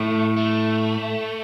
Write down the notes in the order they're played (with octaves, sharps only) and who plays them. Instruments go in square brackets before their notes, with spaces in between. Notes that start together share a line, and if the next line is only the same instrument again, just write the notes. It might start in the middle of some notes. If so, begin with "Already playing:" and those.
Already playing: [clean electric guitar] A2 [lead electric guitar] A3
[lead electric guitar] A3